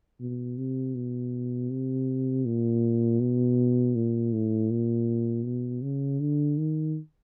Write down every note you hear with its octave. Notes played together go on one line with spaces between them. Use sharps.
B2
C3
B2
C3
A#2
B2
A#2
A2
A#2
B2
C#3
D3
D#3